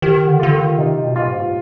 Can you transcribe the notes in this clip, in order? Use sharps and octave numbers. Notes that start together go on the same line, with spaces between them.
D#3 G4
D3
D3 F4
D#3
C3 D#4
B2
F4
G#2